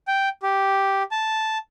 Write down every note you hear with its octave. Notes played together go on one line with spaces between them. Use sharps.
G5
G4
A5